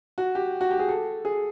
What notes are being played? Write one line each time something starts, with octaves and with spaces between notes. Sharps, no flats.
F#4
G4
F#4
G4
G#4
A4
G#4